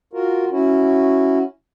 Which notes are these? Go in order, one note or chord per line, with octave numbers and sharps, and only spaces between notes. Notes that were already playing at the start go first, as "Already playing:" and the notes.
F4 F#4 A#4
C#4 E4 F#4